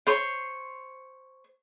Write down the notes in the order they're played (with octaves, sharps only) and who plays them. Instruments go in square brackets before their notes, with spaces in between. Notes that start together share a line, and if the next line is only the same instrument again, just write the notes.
[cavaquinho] C5 C#5 C6